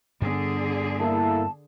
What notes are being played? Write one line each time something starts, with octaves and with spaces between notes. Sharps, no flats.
G2 D3 B3 G#4
A#3 E4 A4 A5